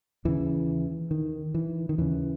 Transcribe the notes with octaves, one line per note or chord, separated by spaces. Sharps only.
D#2 C#3 E3
D#3
E3
D#3
D#2 C#3 E3